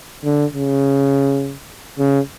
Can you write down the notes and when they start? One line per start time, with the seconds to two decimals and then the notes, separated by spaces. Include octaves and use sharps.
0.25 D3
0.54 C#3
1.99 C#3